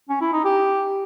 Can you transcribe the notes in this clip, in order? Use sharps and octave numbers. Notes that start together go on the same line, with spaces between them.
C#4
E4
D#4
G4